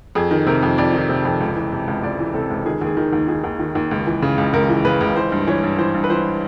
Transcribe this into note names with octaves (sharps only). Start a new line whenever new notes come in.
F2 G#4
D#3
C3 A#4
F2
F2 D5
D#3
C3
F2
C#2
E3
C3
C#2
C#2 D5
E3
C3 A4
C#2
D#3 G#4
D#2
G#4
D#3
D#2
D#3 G#4
D#2
D#3
D#2
C#2
E3
C#3
C#2
C#2 A#4
E3
C#3 B4
C#2
E3 C5
G2
E3 C#5
G2
E3 C5
G2
B4
E3 C5